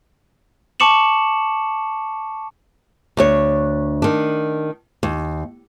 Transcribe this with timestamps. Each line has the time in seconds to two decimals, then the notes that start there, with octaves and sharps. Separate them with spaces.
0.80 A5 C#6 D6 C#7 E7 F#7
3.17 D2 D4 C#5
4.02 D#3 D4
5.03 D#2